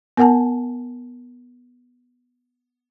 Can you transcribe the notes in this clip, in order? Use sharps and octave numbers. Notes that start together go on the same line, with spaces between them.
B3 A#4 F#5 G#5 A5